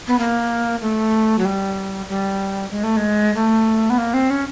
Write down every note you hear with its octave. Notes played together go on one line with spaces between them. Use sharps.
B3
A#3
A3
F#3
G3
G3
G#3
A3
G#3
A3
B3
A#3
C4
C#4